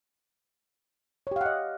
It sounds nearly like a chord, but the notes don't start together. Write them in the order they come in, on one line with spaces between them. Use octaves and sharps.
C#5 G4 F5 F#5 D#5